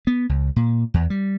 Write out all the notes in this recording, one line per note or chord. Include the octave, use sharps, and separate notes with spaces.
B3
C#2
A#2
E2
G3